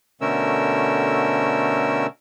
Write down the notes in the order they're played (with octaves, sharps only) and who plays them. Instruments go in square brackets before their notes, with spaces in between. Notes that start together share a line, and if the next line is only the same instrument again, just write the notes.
[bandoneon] B2 D3 A3 C#4 A#4 E6